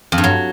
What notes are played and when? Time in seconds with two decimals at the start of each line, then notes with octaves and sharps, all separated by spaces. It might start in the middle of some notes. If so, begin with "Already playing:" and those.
0.12 F2
0.18 G2
0.24 F#3